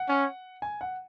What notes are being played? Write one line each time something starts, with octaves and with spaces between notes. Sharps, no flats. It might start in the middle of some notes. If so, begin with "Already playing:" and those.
Already playing: F#5
C#4
G#5
F#5